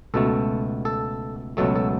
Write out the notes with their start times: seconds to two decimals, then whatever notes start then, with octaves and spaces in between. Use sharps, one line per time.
0.14 C#2 B2 A3 A4
0.85 A4
1.57 C#2 B2 F#3 A3 A4
1.76 A4